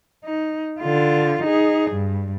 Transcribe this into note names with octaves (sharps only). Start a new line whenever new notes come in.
D#4
D3 F4
D#4 G#4
G2